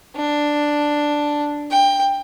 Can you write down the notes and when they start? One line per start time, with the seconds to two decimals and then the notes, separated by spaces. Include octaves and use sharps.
0.16 D4
1.71 G5